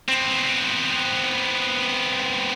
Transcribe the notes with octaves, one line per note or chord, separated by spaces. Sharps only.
B3 C4